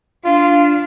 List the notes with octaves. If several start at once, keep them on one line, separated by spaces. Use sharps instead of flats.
D4 F4